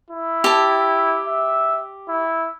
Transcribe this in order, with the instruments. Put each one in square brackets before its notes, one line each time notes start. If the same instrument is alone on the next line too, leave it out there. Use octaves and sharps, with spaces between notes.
[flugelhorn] E4
[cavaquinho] G4 A5
[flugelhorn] E5
E4